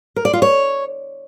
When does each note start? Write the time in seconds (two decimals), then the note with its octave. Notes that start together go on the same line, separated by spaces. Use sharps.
0.16 A#4
0.25 D5
0.33 F4
0.42 C#5